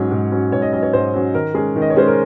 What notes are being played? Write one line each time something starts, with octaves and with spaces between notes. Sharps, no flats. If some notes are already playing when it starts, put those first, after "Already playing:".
Already playing: G#2 F#3 C#4 C#5
G#2
F#3 C#4
G#2 C#5
D#5
F#3 C#4 D#5
C#5
G#2 C5
F#3 C#4
D#3 A#4
G#3 C#4 G#4
D#3
D#5
C#5
G#3 C#4 C5
A#4